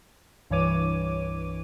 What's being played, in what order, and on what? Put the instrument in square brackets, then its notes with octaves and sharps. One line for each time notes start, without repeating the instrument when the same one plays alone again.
[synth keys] C2 G2 E3 C#5 D6 D#7